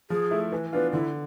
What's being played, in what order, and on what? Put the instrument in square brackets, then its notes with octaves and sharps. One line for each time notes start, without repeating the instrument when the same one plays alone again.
[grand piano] F3 [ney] G#4
[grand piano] A3 E4
[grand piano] E3 [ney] B4
[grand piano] B3 D4 F4 [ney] B4
[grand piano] D3 [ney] E4